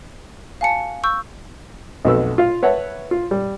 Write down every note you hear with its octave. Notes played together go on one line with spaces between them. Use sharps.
F#4 F5 G#5 A5 C#7
C#6 E6 G6
B1 F2 A3 F#4 B4 E6
F4 F5
B4 C#5 E5 F#5 A5
F4
G3